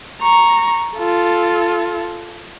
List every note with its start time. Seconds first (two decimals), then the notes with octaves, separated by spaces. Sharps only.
0.22 A#5 C#6
0.98 F4 A4